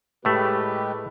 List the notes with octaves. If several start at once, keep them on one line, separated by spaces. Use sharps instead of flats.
A2 G#3 A3 G4 B4